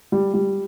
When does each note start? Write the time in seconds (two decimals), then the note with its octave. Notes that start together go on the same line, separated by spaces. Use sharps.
0.12 G3
0.34 G3